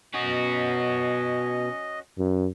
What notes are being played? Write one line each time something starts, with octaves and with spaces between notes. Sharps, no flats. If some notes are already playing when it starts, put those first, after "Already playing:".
B2 C#4 F#4 D#5
F#2